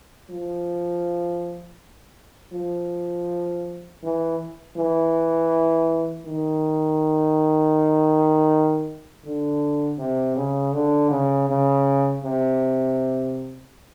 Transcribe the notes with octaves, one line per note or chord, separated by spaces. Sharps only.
F3
F3
E3
E3
D#3
D3
C3
C#3
D3
C#3
C#3
C3